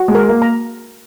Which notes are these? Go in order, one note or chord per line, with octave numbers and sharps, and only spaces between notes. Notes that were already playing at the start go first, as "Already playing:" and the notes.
Already playing: F#4
G#3
A#4
A#3
A#5